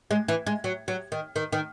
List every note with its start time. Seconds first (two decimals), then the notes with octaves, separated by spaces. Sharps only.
0.11 G#3
0.28 E3
0.47 G#3
0.64 F#3
0.88 F#3
1.12 D#3
1.36 D#3
1.53 D#3